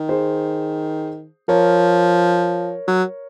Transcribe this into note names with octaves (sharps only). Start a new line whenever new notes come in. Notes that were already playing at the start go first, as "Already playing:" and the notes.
Already playing: D#3
G#4 C5
F3 A#4 C#5
F#3